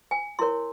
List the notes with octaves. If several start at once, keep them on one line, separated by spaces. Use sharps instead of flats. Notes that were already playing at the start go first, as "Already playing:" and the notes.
G#5
E4 A#4 C#5 C6